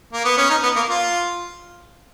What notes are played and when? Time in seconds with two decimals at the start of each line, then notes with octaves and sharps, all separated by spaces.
0.13 A#3
0.25 B3
0.37 C#4
0.50 D#4
0.63 B3
0.76 A#3
0.89 F4